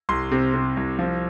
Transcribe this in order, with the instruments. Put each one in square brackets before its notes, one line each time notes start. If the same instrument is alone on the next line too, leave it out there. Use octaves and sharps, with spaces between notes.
[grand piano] C2 C6
C3
C3
C2
F3